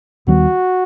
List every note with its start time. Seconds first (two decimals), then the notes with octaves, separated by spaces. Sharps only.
0.27 D#2 D#3 G3 B3 F#4